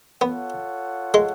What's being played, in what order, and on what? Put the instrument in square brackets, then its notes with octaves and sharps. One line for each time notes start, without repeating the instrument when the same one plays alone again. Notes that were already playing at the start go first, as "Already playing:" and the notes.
[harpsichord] B3 [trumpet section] F4 A4 C#5 F#5
[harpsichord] G#3